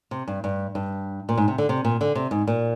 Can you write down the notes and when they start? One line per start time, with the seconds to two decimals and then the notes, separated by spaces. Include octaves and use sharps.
0.11 C3
0.28 G2
0.44 G2
0.75 G2
1.29 A#2
1.38 G#2
1.48 C3
1.58 D3
1.69 C3
1.85 A#2
2.01 D3
2.15 C3
2.31 G#2
2.47 A#2